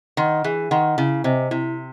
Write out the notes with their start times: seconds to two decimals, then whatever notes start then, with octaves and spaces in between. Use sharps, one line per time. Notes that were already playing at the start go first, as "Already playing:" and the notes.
0.17 D#3 D#5 F#5 C6
0.44 E3 G#4
0.71 D#3 D#5 F#5 C6
0.98 C#3 E4
1.24 C3 C5 D#5 G#5
1.51 C3 E4